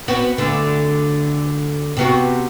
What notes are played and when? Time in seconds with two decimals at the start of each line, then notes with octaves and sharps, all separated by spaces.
0.08 B3 C4 F#4
0.38 D2 D3
1.97 C3 B3 F#4